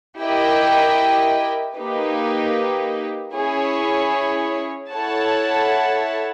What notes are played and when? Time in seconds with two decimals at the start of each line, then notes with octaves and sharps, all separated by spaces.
0.19 E4 G4 A#4 D#5 G5
1.77 A#3 D#4 G4 B4
3.35 C#4 E4 G#4 C#5
4.93 E4 A4 C#5 F#5 A5